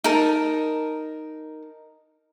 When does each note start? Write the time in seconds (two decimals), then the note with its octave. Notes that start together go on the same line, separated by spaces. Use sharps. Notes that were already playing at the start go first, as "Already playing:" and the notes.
0.04 D#4 A#4 A5